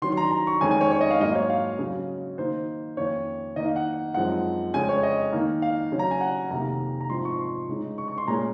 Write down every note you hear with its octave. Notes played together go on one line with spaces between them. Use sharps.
D#3 F#3 C#4 C6
C6
A#5
A#5
C#6
F2 D#3 G#3 C#4 G#5
G#5
C#5
C#5
D#5
F5
G#2 F#3 A#3 D#4 D#5
C#5
F5
C#3 F#3 C#4
D#3 A#3 D#4 C5
F2 D#3 A#3 C#4 C#5
D#3 A#3 D#4 D#5
F5
F#5
F#2 F3 G#3 C4 D#4 F#5
F2 C#3 G#3 C#4 G#5
C#5
D#5
D#3 A#3 D#4
F5
C#3 F#3 C#4
A#5
G#5
F#5
F2 C3 D#3 A#3 A#5
A#5
G#2 F3 C4 D#4 C6
C#6
C6
C#3 G#3 D#4
C#6
C#6
C6
A#2 G#3 C#4 A#5